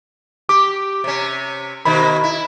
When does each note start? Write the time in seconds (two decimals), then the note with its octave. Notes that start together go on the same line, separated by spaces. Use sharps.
0.49 G4 D6
1.04 C3 C#4
1.85 B2 D#3 A#3 B5
2.24 E4